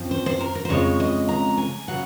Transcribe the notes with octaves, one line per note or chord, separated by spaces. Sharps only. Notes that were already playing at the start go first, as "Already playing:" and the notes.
Already playing: F#2 F3 C4
C5
C5
A#4
A#4
C5
F2 C#3 G#3 C#5
D#5
A#5
G#5
C#3 F#3 F#5